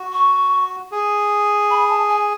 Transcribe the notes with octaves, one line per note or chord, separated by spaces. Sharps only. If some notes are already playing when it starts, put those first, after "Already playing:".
Already playing: F#4
C#6
G#4
B5
A5
G#5